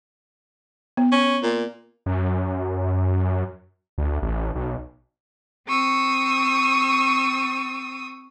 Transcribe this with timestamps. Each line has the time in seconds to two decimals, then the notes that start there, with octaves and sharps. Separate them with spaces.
0.97 B3
1.12 C#4
1.43 A#2
2.06 F#2
3.98 D2
4.22 A1
4.55 B1
5.68 C4 C#6 D#6 E6